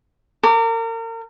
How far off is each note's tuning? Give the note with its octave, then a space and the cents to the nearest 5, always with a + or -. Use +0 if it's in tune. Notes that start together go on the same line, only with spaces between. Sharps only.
A#4 -35 D6 -5